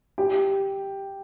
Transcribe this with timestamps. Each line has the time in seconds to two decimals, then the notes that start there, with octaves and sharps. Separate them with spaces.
0.18 G4